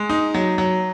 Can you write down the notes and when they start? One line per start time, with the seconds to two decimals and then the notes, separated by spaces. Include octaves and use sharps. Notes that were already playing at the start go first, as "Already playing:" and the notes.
Already playing: G#3
0.10 D#4
0.34 F#3
0.58 F#3